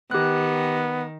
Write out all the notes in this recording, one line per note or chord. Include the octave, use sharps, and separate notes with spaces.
D#3 B3 G4 F#6